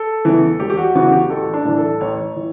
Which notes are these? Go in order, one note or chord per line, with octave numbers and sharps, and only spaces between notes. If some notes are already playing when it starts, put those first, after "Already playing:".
Already playing: A4
E2 C#3 E3
E1 G4
G4
F#4
E2 C#3 E3 F#4
G4
A1 A4
D4
A2 E3
A4
A1 C#5
E3